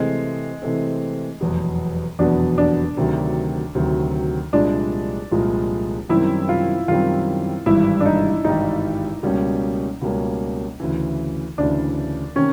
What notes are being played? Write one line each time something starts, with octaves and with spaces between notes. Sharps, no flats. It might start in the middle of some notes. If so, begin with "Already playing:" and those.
Already playing: C3 E3 G#3 A3 C4
C3 E3 A3 C4
F1 E2 B2 F#3 B3
F1 E2 B2 F#3 B3 D4
D4
D2 C3 D#3 F#3
D2 C3 D#3 F#3
C2 A#2 F3 G#3 D4
C2 A#2 F3 G#3
F#2 D#3 G3 C4 E4
F4
F#2 D#3 G3 C4 F4
G#1 G2 E3 G3 E4
D4
D#4
G#1 G2 E3 G3 D#4
C#2 B2 G3 A#3 C#4
C#2 B2 G3 A#3 C#4
D2 C#3 E3
D2 C#3 E3 D4
C3 D#3 C#4